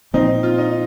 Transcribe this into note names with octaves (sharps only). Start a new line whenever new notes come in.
A#2 F3 C4 D#4
F4
D#4